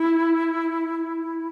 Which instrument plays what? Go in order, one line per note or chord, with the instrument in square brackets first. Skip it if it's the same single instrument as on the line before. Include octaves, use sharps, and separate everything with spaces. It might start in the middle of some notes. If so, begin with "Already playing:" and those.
Already playing: [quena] E4